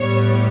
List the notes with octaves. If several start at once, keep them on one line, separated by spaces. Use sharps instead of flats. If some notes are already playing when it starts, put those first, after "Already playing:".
Already playing: A2 G3 B3 C#5